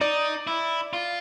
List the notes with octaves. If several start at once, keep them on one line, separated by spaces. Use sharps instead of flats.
D#4 D5
E4
F4